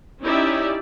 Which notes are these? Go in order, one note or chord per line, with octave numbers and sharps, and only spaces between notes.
C#4 D#4 E4 G4 D5 E5